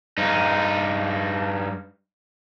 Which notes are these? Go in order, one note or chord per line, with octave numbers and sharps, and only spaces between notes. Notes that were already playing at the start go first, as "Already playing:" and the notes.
G2 D#4